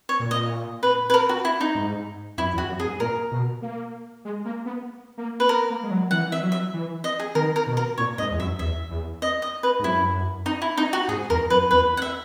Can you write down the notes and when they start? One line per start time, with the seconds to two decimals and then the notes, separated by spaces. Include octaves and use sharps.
0.09 C#5
0.19 A#2
0.31 D#5
0.83 B4
1.10 B4
1.14 A#4
1.29 F#4
1.45 E4
1.61 D#4
1.75 G#2
2.38 F#2 E4
2.54 E2
2.58 F#4
2.69 F#2
2.80 G#4
2.84 G#2
3.00 A#2 A#4
3.31 B2
3.62 A#3
4.25 G#3
4.45 A#3
4.66 B3
5.18 A#3
5.40 B4
5.49 B3 A#4
5.70 A#3
5.83 G#3
5.91 F#3
6.11 E3 F#5
6.32 E5
6.42 F#3
6.52 E5
6.74 E3
7.04 D#5
7.20 G#4
7.35 D#3 A#4
7.56 A#4
7.67 B2
7.77 A#4
7.98 A#2 C#5
8.18 G#2 D#5
8.30 E2
8.39 F#2 E5
8.59 E2 E5
8.90 E2
9.22 D#5
9.42 D#5
9.63 B4
9.79 G#2
9.84 F#2 E4
10.46 D#4
10.62 E4
10.78 D#4
10.93 F#4
11.08 G#2 G#4
11.30 E2 A#4
11.50 F#2 B4
11.71 E2 B4
11.97 F#5
12.02 E5